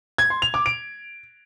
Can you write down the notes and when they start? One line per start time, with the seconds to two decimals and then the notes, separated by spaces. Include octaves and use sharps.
0.18 G#6
0.30 C6
0.42 F7
0.54 D6
0.66 D7